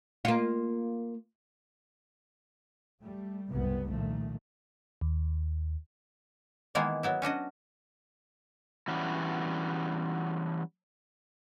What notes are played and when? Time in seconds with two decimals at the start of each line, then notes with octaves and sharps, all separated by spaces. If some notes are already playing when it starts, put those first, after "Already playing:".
0.25 A#3 F4
3.02 G3 A3
3.51 F#1 C2 G#2 C3 G3 B3
3.90 A#2 D#3 F3 A3
5.01 D#2
6.75 D#3 E3 G#3 A#3 B3 E4
7.03 F#3 B3 E4
7.22 C#4 D4 F#4 D#5
8.88 E3 F#3 G3 B3 C#4 D4